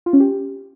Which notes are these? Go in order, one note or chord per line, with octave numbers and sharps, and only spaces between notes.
F4
C#4
G4